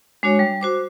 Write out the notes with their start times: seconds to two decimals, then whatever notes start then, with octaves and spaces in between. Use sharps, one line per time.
0.23 G#3 D4 F#4 C#5
0.39 G3
0.61 F#4 C5 D6